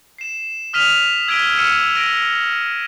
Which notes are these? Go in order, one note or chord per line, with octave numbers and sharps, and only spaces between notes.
C7 E7
D#6 F6 B6 D#7 F7
E6 G#6 B6 D7 D#7 G7
E6 F6 C#7 D#7 E7
A#6 D7 D#7